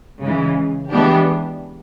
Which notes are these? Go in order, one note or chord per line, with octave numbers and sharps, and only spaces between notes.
C#3 E3 G#3
E3 G#3 B3 D4 G4